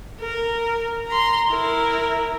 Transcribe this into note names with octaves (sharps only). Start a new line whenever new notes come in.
A#4
A#5 C6
E4 A#4